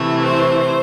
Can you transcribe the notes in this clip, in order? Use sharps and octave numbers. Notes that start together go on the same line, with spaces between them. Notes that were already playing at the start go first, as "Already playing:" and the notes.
Already playing: C3 E3 A3
C5